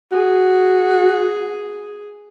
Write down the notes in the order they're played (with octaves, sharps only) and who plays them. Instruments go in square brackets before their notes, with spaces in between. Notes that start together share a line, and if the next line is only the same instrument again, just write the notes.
[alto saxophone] F#4 [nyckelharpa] G#4